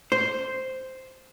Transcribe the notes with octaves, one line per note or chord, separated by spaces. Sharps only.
C5